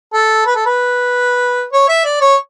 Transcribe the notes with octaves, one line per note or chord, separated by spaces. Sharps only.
A4
B4
A4
B4
C#5
E5
D5
C#5